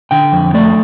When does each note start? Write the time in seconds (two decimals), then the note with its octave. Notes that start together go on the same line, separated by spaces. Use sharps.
0.11 D3 G5
0.32 F2
0.54 A3 D5